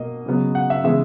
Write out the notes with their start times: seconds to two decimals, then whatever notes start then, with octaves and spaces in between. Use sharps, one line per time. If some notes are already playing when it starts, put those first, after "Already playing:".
Already playing: B2 A#3 D#5
0.26 C#3 F#3 B3
0.55 F#5
0.70 E5
0.84 C#3 E3 G#3 B3 E5